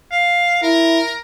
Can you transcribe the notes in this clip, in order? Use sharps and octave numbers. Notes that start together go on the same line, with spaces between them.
F5
E4 A#4